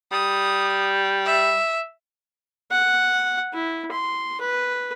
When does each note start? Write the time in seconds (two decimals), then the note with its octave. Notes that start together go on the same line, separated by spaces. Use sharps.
0.12 G3 D#6
1.26 E5
2.71 F#5
3.53 E4
3.91 C6
4.40 B4